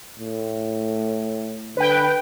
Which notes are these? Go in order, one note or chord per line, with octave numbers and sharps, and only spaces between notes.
A2
D3 B4 G5